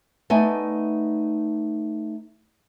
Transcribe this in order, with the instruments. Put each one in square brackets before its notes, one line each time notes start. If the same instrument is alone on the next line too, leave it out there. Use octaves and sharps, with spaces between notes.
[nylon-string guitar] A3 B3 D#4 D5 G#5